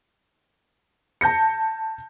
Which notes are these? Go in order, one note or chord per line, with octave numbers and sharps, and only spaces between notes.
A5 G6 A#6 C#7